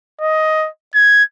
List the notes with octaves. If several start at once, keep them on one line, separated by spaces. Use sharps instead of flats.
D#5
G#6